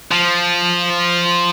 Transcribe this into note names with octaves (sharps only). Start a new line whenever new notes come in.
F3